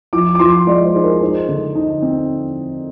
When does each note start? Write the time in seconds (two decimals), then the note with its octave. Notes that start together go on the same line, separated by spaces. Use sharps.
0.13 F3 D6
0.35 D6
0.39 F3 C6
0.67 G#3 D5
0.85 C5
0.95 D#4 G#4
1.04 A#4
1.21 D#4 C5
1.49 D3
1.75 D#4
2.02 C4